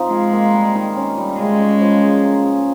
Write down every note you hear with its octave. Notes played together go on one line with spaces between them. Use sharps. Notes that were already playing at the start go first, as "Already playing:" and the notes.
Already playing: F3 C4 D#4
G#3 F4
A#3
G3
D#3
C#4
G3
C#3 G#3
C#4
F3
G#4
A#3
G#4